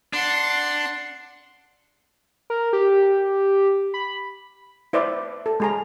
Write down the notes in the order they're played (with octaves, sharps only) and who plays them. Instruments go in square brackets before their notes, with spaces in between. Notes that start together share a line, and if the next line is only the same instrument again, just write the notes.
[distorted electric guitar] D4 [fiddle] F#5 C6
[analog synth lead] A#4
G4
B5
[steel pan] E4 B4 C5 D5 E5
A4
G#3 G#4 A#5